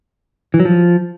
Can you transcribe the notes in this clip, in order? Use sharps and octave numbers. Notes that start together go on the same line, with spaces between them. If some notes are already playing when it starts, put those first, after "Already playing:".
E3
F#3
F3